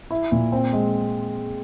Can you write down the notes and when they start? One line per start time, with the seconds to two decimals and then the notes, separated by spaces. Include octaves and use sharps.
0.11 E4
0.32 A#2
0.52 C4
0.73 G#3